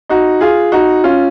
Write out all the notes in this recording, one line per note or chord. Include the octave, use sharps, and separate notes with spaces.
D#4 F#4
F4 G#4
D#4 F#4
C#4 F4